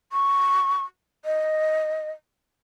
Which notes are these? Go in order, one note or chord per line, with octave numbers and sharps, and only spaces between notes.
C#6
D#5